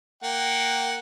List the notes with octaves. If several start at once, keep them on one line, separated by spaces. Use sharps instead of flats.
A#3 F#5 G5